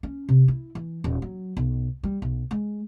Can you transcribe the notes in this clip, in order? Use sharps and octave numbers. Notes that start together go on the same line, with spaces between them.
C#4
C3
E4
E3
D#1
F#3
B1
G3
B1
G#3